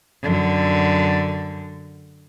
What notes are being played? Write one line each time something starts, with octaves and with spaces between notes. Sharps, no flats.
F#2 D3